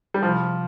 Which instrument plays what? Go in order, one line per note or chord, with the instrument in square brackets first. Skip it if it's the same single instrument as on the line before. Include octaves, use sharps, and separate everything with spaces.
[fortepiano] G3
[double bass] C3 [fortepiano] F3